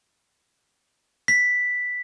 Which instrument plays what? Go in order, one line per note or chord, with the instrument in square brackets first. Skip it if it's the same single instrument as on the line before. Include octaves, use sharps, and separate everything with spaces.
[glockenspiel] B6